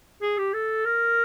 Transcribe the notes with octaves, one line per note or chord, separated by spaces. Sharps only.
G#4
G4
A4
A#4